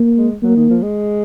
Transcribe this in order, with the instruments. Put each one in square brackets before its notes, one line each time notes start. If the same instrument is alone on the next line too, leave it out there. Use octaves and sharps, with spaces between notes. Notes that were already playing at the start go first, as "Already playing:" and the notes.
Already playing: [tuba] A#3
[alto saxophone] G#3
[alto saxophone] F#3 [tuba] A#3
[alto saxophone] D#3
F3
G#3